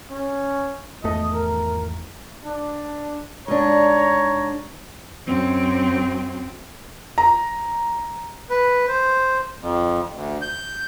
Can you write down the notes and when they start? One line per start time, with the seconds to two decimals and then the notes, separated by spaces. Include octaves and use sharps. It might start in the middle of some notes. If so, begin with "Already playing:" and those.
0.11 C#4
1.04 G#1 E2 A3 D#5
1.34 A#4
2.45 D4
3.48 G#2 D4 C#5 A#5
5.26 F#2 C4
7.18 A#5
8.50 B4
8.88 C5
9.61 F2
10.13 D2
10.42 G6